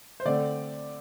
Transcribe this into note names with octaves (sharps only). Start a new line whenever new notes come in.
C5
D3 A3 C4 D5